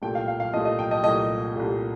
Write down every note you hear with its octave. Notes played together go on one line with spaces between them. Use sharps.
C2 A#2 A3 G5
F5
F5
F5
C2 A#2 A3 D#5
D#5
G5
D#5
C2 A#2 A3 D#5
C2 A#2 A3